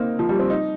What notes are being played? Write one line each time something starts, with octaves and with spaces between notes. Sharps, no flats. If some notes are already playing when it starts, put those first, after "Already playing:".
Already playing: A#3 C4 D#4
F3
G3
C4
D#4